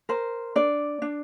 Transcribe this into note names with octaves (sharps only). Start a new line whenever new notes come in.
A#4 C5
D4 D5
D4